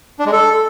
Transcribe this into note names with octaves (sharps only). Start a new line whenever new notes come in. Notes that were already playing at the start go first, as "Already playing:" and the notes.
D4
G#3
A4